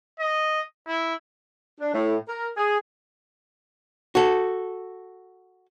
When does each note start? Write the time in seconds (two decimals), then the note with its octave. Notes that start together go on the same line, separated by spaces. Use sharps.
0.20 D#5
0.88 E4
1.80 D4
1.94 A2
2.28 A#4
2.57 G#4
4.15 F#4 A4